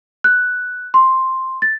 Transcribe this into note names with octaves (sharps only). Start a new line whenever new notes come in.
F#6
C6
A6